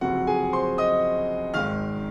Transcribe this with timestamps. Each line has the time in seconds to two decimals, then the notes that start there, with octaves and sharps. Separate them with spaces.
0.01 F#1 F2 C3 F#4 F#5
0.27 G#4 G#5
0.52 C5 C6
0.78 D#5 D#6
1.54 G#1 G#2 D#3 F5 F6